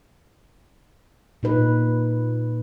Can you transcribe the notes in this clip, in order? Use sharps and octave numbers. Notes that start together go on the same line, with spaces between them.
A#2 D#4 B4